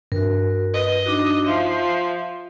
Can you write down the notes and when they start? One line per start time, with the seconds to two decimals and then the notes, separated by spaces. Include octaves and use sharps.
0.12 G2 F#4 A#4
0.74 B4 D#5
1.06 D4 D#4 F#4
1.46 F3 E5